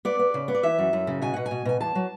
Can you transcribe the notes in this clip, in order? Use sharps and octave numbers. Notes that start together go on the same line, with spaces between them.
B3 D5
B3
C#3
B3
D5
E3 E5
F#2
F#2
C#3
B2 G#5
B2 F#5
G#5
B2
B2 G#5
E2 A5
F#3